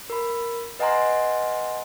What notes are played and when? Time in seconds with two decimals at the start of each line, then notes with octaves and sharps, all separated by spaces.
0.10 A#4 B5
0.79 B4 D#5 F#5 G#5 A#5 C6